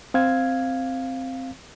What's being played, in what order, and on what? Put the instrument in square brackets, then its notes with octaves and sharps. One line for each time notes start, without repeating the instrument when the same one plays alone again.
[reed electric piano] C4 F5 G#6